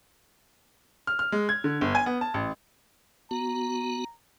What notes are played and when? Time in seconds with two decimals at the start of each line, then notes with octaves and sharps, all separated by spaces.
1.07 F6
1.19 F6
1.32 G#3
1.49 G#6
1.64 D3
1.81 G1
1.95 G#5
2.06 B3
2.21 A5
2.34 A1
3.31 B3 F#4 A#5